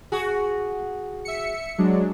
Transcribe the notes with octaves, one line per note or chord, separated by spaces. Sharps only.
F#4 G#4
E5 C#7
F#3 G#3 D4